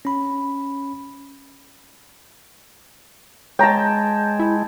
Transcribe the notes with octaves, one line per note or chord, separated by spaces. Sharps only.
C#4 B5
G#3 C#5 G5 A5 A#5
E4